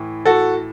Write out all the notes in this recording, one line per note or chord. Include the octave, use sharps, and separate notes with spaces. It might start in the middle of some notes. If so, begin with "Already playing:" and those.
Already playing: A2 E3
F#4 A4